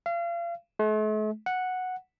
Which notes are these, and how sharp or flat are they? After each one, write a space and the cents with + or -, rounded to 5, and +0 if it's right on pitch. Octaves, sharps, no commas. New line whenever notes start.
F5 -35
A3 -45
F#5 -5